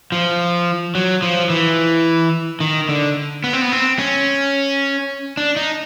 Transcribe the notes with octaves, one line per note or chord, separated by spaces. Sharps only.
F3
F#3
F3
E3
D#3
D3
B3
C4
B3
C4
C#4
D4
D#4